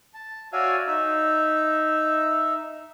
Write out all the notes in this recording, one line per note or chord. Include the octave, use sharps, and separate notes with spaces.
A5
F#4 C#5 D5 E5 F5 G#5
D#4 E5